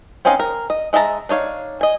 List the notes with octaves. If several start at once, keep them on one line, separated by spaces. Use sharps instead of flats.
C4 C#4 D#4 D#5 F5
A#4
D#5
G#3 D#5 E5 A5 A#5
D4 D#4 C#5 F5
D#5 G#5